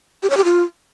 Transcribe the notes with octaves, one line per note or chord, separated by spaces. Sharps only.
G4
C#5
G4
F4